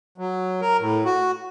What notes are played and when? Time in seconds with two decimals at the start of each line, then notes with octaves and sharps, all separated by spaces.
0.18 F#3
0.61 A#4
0.80 A2
1.05 F#4